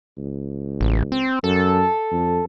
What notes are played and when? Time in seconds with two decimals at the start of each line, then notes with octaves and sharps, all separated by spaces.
0.18 C#2
0.81 A1
1.12 C4
1.44 F#2 A4
2.12 F2